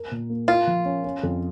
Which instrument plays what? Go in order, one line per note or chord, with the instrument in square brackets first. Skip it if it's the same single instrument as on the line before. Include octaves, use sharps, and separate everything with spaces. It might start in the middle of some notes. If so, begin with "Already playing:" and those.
Already playing: [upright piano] A#4
A#2
A#3
[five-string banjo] F4 [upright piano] A#4
[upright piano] F3
C#4
C#4
F2